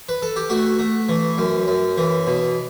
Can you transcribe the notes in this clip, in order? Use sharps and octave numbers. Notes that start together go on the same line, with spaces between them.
B4
A4
G4
A3 F#4
A3
E3
F#2
F#2
E3
B2